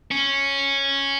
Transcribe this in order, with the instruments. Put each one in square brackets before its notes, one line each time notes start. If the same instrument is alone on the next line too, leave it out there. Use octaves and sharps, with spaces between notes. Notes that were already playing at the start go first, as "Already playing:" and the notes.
[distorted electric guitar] C#4